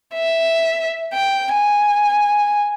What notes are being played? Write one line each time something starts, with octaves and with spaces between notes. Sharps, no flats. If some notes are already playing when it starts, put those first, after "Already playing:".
E5
G5
G#5